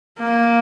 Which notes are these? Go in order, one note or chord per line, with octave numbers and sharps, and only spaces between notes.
A#3